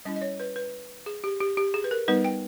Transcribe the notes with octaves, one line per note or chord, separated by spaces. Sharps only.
G3 C#4 E4 D#5
D#5
C#5
B4
B4
G#4
G4
G4
G4
G#4
B4
A#4
G3 B3 D#4 B4
G5